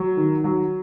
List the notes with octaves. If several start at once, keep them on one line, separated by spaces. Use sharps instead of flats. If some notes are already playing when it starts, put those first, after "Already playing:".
Already playing: F#3
D#3
F#3